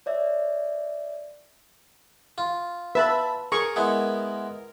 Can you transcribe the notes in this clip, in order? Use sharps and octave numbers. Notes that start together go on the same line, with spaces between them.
C#5 D5 E5
F4
B4 E5 A5 B5
G#4 A#4 C#6
G#3 B3 E4